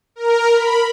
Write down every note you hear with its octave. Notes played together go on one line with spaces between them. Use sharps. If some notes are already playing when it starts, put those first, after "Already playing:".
A#4
B5